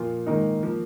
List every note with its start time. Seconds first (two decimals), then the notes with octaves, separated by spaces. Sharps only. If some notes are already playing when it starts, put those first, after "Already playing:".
Already playing: A#2 F3 A#3 F4
0.27 G#2 D#3 A#3 D#4
0.63 F3 A#3